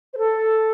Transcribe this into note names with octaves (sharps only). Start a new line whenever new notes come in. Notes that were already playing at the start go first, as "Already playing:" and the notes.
C5
A4